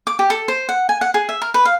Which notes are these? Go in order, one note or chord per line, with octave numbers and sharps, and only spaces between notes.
D6
G4
A4
C5
F#5
G#5
F#5
G#4
E5
A#4
B4
F5